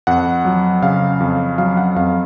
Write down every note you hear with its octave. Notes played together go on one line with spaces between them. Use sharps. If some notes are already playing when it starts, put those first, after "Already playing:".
F2 F#5
F#3
C#3 F5
F2
F#3 F5
F#5
F2 F5